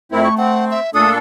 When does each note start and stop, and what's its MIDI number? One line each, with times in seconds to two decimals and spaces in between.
0.12 0.28 41
0.12 0.76 57
0.12 0.28 60
0.12 0.28 64
0.12 0.23 70
0.24 0.35 85
0.38 0.80 60
0.38 0.65 78
0.71 0.90 76
0.94 1.18 46
0.94 1.10 57
0.94 1.18 62
0.94 1.18 69
0.94 1.10 87